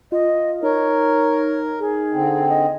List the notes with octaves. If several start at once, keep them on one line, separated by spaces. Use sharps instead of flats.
F4 D#5
D#4 A#4 C#5
G#4
D3 C4
D#5